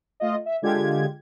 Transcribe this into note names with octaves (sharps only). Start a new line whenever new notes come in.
A3 F4 D#5
E5
D3 G#3 F4 G4 G#6